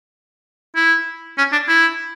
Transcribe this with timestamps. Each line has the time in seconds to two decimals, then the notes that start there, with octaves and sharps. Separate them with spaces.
0.76 E4
1.38 C#4
1.52 D4
1.68 E4